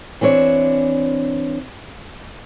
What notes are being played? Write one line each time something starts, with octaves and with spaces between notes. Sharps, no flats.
E3 C4 D4 C#5